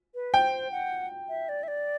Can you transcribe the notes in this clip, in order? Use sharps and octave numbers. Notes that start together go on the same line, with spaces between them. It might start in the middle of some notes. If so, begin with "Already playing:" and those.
B4
C5 G5
F#5
E5
D5
E5
D5